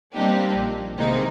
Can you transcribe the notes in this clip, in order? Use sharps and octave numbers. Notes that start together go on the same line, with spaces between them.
G3 A#3 C4 D4 D#4 G4
A#1
C3 D#3 E3 G#3 A#3 D#4